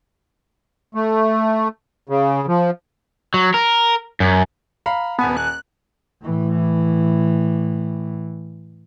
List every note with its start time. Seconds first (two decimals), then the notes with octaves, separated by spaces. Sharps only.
0.95 A3
2.09 C#3
2.48 F3
3.34 F#3
3.54 A#4
4.20 F#2
4.86 F5 A#5 B5
5.19 D#1 B3 G#5 A5
5.37 F#6
6.23 A2 E3